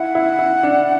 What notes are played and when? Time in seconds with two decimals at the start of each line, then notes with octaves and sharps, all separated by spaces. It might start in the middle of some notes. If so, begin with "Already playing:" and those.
Already playing: E4 F#5
0.15 E4
0.39 E4
0.63 D4